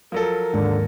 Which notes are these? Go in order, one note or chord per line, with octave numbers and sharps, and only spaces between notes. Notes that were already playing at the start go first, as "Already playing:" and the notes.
F3 F#3 A4 A#4
D#2 G#2 D3